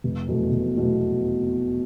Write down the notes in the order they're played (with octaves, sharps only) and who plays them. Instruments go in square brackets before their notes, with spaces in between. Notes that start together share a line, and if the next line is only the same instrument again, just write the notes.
[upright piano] F1
E2 B2 F#3 A3
F1
E2 B2 F#3 A3